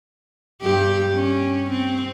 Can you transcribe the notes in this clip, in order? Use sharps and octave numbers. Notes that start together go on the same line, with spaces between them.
G2 G4
C#4
C4